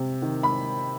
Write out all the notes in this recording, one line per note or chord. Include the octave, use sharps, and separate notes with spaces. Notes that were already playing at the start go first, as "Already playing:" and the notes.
Already playing: C3
D#3
B5